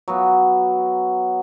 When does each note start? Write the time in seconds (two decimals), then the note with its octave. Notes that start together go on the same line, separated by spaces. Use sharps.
0.08 F#3 B3